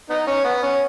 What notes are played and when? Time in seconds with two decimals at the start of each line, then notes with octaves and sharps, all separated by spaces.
0.10 B3 D#4
0.27 C#4
0.44 B3
0.62 C#4